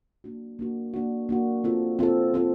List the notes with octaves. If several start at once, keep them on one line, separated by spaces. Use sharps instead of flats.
A#3 D4 F#4
A#3 D4 F#4
A#3 D4 F#4
A#3 D4 F#4
C4 F4 A4
C4 F4 A4
C4 F4 A4